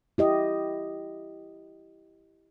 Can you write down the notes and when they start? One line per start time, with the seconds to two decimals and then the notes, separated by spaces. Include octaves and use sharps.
0.18 E4 G4 D#5